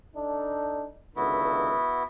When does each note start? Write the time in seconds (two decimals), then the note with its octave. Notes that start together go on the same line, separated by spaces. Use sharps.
0.16 D4 D#4 A4
1.16 C#2 D3 D#3 B3 E4 F#4